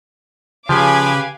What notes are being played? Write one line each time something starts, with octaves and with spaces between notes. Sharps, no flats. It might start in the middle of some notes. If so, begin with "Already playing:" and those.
C#3 F3 G4 B4 F5 G#5 B5 D6